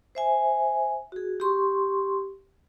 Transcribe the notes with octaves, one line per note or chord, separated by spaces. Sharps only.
C5 E5 G#5
F#4 G#4
G4 C6 C#6